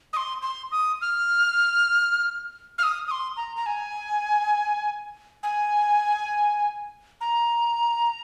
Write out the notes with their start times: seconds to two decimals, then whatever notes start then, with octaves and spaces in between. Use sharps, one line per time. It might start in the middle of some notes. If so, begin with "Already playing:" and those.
0.13 D#6
0.17 C6
0.42 C6
0.72 D#6
1.02 F6
2.78 F6
2.83 D#6
3.07 D#6
3.11 C6
3.37 A#5
3.56 A#5
3.66 G#5
5.43 G#5
7.21 A#5